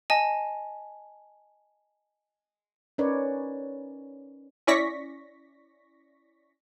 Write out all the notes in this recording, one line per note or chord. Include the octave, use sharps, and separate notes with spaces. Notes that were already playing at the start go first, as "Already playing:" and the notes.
D#5 G#5 A5
C#4 D#4 A#4 B4 C#5 D5
C#4 E4 D5 C#6 A#6 B6